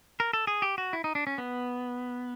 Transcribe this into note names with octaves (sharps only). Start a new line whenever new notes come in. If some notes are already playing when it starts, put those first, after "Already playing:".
A#4
A4
G#4
G4
F#4
E4
D#4
D4
C#4
B3